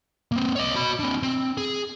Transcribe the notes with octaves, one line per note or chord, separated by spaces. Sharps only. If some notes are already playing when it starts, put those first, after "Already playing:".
A#3 C4
C#5 D#5
F#4 B5
C4 D4
C4
G#4